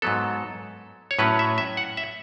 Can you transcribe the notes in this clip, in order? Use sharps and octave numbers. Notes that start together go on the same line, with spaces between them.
G#2 F#3 B3 A4
C#5
A2 F#3 C#4 B4
E5
E5
F#5
E5